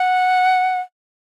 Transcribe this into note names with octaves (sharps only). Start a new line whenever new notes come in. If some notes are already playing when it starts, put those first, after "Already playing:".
Already playing: F#5